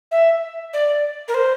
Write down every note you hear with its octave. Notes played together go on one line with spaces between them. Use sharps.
E5
D5
A#4
C5